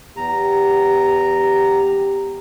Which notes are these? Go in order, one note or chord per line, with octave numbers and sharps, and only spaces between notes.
E2 G4 A#5